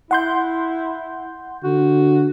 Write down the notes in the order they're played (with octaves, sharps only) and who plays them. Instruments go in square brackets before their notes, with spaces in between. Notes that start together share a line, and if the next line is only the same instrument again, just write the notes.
[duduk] E4 [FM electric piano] F#5 C6 G6
[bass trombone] D3 [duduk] F#4